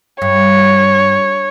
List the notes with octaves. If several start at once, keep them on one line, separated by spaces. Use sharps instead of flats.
G2 C#5